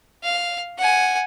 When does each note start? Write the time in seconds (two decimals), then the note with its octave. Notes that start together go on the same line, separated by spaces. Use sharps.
0.23 F5
0.78 F#5 G#5